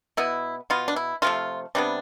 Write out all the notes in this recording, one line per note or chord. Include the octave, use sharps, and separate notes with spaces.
B2 B3 E4
B2 B3 F4
D4
E4
C3 F3 A3 F4
C3 G3 B3 D4